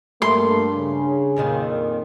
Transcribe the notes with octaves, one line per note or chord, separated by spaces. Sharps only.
G2 A3 A#3 C6
C#3
F2 A#2 D#3